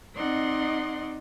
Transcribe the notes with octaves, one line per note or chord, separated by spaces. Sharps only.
C4 D#4 D5 D#5 F#5 C6